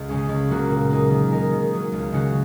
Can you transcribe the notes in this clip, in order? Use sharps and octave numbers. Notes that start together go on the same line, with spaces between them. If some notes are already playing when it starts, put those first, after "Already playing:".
Already playing: C#2
C#3 G#3 C#4 G#4
C#2
C#3 F#3 A#3 F#4
A#2
A#3 D#4 G#4
D#3
G#3 D#4 A#4
D#3
F#3 C#4 G#4
C#2
C#3 G#3 C#4 F#4